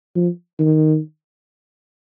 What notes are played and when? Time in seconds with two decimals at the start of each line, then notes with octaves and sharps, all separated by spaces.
0.15 F3
0.59 D#3